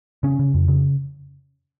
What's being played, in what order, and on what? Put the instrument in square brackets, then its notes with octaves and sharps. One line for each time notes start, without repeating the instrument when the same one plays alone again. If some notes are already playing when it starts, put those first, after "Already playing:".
[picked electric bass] C#3 C#4
C#3
F2
C#3